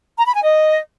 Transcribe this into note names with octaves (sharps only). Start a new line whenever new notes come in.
A#5
B5
G#5
D#5